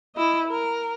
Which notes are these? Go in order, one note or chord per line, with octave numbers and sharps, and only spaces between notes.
E4 D#5
A#4